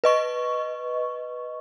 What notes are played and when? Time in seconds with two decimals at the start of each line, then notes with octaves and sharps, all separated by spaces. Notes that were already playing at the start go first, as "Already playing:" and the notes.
0.04 B4 D#5 C#6